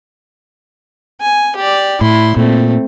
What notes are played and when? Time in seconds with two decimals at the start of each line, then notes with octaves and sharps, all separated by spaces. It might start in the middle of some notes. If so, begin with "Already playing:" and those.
1.21 G#5
1.56 G4 D5
2.01 A2 E4 C6
2.37 A#2 A3 C4